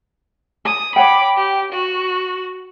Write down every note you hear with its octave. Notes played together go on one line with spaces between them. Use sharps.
G#5 A5 D#6
C#5 F#5 G5 B5 D6
G4
F#4